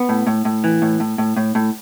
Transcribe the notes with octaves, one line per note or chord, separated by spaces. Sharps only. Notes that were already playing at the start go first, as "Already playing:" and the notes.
Already playing: B3
A2
A2
A2
E3
A2
A2
A2
A2
A2